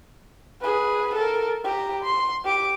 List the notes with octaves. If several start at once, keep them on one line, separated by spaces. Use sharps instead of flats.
G#4 B4
A4 A#4
G4 A#5
C6
G4 D6